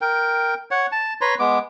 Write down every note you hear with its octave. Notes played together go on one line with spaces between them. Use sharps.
A#4 G5
C#5 F#5
A5
B4 C#5 A#5 C6
G#3 B3 D6